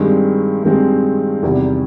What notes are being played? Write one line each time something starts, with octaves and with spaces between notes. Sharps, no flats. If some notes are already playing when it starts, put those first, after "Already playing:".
Already playing: G2 D#3 G#3 C4
G2 D#3 G#3 C4
E2 C3 D#3 G3